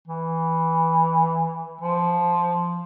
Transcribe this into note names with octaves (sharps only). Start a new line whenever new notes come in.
E3
F3